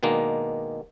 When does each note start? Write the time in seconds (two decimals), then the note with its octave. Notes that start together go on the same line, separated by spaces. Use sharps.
0.03 B2 D#3 G#3 A#3 D4